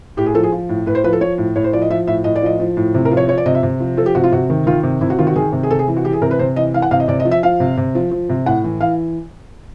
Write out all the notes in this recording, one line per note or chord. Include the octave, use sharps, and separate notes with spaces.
A2 G4
G#4
F3 A4
G#4
F3
A2
A2 B4
C5
F3 B4
A4
F3 C#5
A2
A2 C#5
C5
F3 D5
D#5
F3 E5
A2 E5
A2 D#5
D5
F3 D#5
F3
A2
C3
A#4
F3
C#5
F3 C#5
D5
C3 D#5
E5
C3
F3
F3 A4
G4
C3 F#4
F4
C3 F#4
D#3
D#3 F4
C3
C3 E4
F#4
D#3 F4
F#4
D#3 G#4
C3
G#4
C3 A4
G#4
E3
F#4
E3 G4
G#4
C3 A#4
B4
C3 C5
E3 D#5
E3 F5
F#5
C3 F5
D#5
C3 D5
D#5
F3
E5
F3 F5
C3
C3
F3
F3
C3
A2 F#5
E3
E3 F5